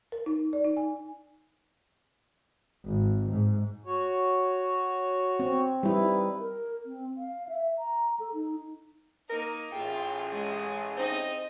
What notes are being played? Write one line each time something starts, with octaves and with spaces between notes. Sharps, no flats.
A#4
D#4
D5
D#4
G#5
G#1
G#2
F#4 C#5
C4
G3 D#4 E4 B4
A#4
C4
F5
E5
A#5
A4
D#4
A#3 D#4 A#4
A1 F4 G#4 E5 G5
G#3
C4 D#4 D#5